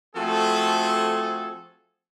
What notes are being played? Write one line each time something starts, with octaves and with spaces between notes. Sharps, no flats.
F3 A3 C4 F#4 G#4 A4